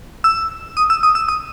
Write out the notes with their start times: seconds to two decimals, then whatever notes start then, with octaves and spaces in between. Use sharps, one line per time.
0.24 E6
0.77 D#6
0.90 E6
1.03 D#6
1.15 E6
1.28 D#6